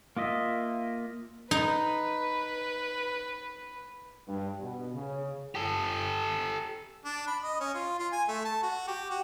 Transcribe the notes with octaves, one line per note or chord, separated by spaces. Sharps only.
A#3 F4 D#5 E5
D#4 B4
G2
B2
C#3
G4 A4
D4
B5
D#5
C#4
F4
F4
G#5
A3
A5
F#4
G4
F#4